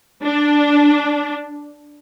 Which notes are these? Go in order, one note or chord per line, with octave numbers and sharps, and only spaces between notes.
D4